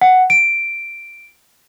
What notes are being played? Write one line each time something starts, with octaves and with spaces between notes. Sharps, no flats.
F#5
D7